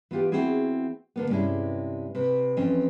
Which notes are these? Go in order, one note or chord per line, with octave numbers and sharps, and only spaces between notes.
E3 B3 F4 G4
C4 E4 F#4 G#4
D3 A#3 B3
G2 C3 G#3 C#4 E4
C3 B4
F2 E3 C4 C#4 D#5